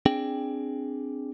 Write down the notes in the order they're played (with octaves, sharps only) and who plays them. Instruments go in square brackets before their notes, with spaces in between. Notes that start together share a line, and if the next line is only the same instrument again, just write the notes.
[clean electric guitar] C4 D4 G#4 G5